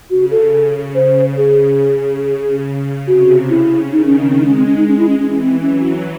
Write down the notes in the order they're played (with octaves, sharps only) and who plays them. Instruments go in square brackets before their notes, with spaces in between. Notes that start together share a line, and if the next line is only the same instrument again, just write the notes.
[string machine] C#3 [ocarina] F#4
[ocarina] A4
[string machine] C#3 [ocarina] C5
[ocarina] G#4
[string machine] C#3
[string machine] C3 [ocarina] F#4
[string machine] C#3 [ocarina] E4
[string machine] D#3 [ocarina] D#4
[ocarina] C#4
C#4
C4
[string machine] G#3 [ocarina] C#4
[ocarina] D#4
C#4
C4
C#4
[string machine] G#3 [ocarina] D#4
[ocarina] C#4
E4
C#4
[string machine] E3 [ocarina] C#4
[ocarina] C#4
C4
[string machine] F#3 [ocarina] C#4